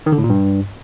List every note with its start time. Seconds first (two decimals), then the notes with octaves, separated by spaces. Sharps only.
0.06 D#3
0.12 D3
0.18 A2
0.24 A#2
0.30 G2